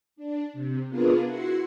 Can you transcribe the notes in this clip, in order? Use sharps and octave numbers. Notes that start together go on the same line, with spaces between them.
D4
C3
B3 D4 F4 G#4 A#4 B4
E4 F#4 C6 C#7